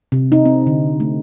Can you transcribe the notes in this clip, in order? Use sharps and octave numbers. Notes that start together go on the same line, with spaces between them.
C3
D#4
C4
D3
A3